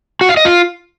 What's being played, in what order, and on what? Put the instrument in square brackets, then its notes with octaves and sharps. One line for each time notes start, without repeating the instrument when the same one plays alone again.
[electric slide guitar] F#4
F5
D#5
F4